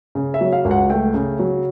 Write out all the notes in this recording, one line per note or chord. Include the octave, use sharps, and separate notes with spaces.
C#3
E5
F#3
F5
C#2
F#5
A3 G5
C#3
F#3